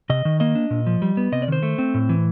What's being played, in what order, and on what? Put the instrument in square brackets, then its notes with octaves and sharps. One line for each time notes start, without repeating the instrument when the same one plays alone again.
[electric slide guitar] C3 D#5
D#3
A#3 D#5
D4
A#2
F3
G3
B3
C3 D#5
D5
D#3 C5
A3
C4
A2
E3